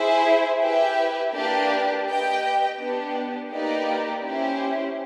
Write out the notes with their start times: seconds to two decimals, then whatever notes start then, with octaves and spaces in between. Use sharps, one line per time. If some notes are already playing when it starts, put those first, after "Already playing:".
Already playing: E4 G#4 C5 E5
0.61 E4 G4 B4 E5 G5
1.33 A#3 D4 G4 B4 D5
2.05 G4 B4 D#5 G5
2.78 B3 D4 G4
3.51 A#3 D#4 G4 B4 D5
4.23 C#4 E4 G4 C5